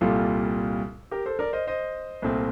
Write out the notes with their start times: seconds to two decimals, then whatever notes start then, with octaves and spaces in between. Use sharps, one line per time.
0.01 C2 A#2 G3 F4 A4
1.11 G4 A#4
1.26 A4 C5
1.39 A#4 D5
1.53 C5 D#5
1.67 C5 D#5
2.22 C2 A#2 A3 C4